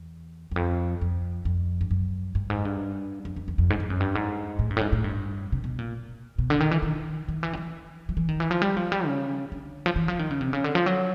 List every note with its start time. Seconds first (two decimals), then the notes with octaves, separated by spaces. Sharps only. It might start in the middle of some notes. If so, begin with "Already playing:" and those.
Already playing: E2
0.51 E2
0.56 F2
1.02 F2
1.45 F2
1.81 G2
1.91 F#2
2.35 G2
2.50 G#2
2.65 G2
3.25 F2
3.36 F2
3.48 E2
3.58 F2
3.70 G#2
3.80 G2
3.90 F#2
4.00 G2
4.15 G#2
4.59 A2
4.70 G2
4.77 A2
4.81 G#2
4.92 A2
5.04 G2
5.52 C3
5.64 B2
5.79 A#2
6.38 B2
6.50 D3
6.60 D#3
6.71 E3
6.83 D#3
7.28 D#3
7.43 E3
7.53 D#3
7.57 E3
8.09 F3
8.17 E3
8.29 D#3
8.40 E3
8.51 F3
8.62 G3
8.77 F3
8.92 G3
9.06 C#3
9.52 D3
9.86 F3
9.96 E3
10.08 F3
10.19 D#3
10.31 C#3
10.41 C3
10.53 C#3
10.64 D3
10.75 F3
10.86 F#3